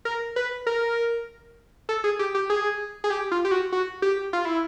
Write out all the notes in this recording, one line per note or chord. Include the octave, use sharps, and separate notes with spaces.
A#4
B4
A#4
A4
G#4
G4
G4
G#4
G#4
G4
F4
G4
F#4
F#4
G4
F4
E4